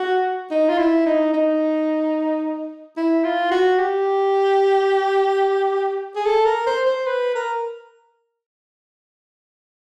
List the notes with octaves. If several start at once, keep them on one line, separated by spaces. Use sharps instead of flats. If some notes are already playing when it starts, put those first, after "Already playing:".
Already playing: F#4
D#4
F4
E4
D#4
D#4
E4
F4
F#4
G4
G#4
A4
A#4
C5
C5
B4
A#4